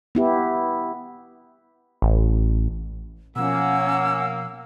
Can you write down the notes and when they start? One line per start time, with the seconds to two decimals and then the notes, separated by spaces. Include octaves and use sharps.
0.15 B3 E4 G4
2.02 A1
3.36 B2 F3 A#3 C#4 F#5 E6